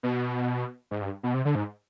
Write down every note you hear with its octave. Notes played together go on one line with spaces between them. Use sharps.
B2
G#2
G2
B2
C3
D3
G#2